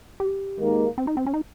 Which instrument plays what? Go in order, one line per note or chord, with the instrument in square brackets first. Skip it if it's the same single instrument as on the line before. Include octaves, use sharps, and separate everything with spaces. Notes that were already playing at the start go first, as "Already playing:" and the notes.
[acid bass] G4
[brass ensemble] G#2 D#3 A#3
[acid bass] C4
D#4
C4
C#4
D#4